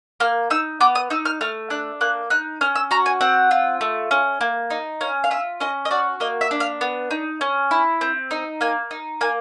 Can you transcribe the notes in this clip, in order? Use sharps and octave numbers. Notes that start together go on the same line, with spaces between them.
A#3 F6
D#4 E6
B3 D6
D#6
D#4 E6
F6
A3 F6
D4 F#6
A#3 F#6
D#4 F#6
C#4 F6
E6
F#4 A#5
G#5
C4 F#5
F4
A3
C#4
A#3
D#4
C#4 F5
F5
F4 E5
C#4 D#5
D#5
F#4 D5
A#3 D#5
E5
D4
F5
B3
D#4
C#4
E4
C4
D#4
A#3 G#5
D#4
A#3 G#5